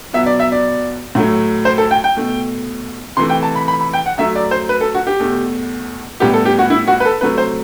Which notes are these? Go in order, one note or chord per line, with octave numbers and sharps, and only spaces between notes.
B2 F#3 B3 E5
D5
E5
D5
A2 F#3 A3
C5
A4
G5
G5
B2 A3
C3 E3 A3 C6
G5
A5
B5
B5
B5
G5
F#5
F#2 F#3 A3 E5
D5
C5
B4
A4
F#4
G4
E2 B2 A3
A2 G3 B3 G4
A4
G4
F#4
E4
F#4
B4
A4
C3 F#3 A3 B4
C5